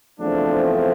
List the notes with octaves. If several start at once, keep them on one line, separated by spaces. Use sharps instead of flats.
E2 C#3 F3 A3 C4 D4